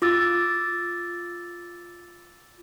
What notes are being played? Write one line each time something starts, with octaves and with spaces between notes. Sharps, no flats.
F4 D6 E6 A6